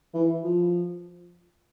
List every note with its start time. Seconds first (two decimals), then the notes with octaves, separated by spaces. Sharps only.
0.14 E3
0.44 F3